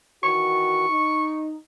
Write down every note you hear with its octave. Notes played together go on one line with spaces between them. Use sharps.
D#3 E3 F#4 C#6
D#4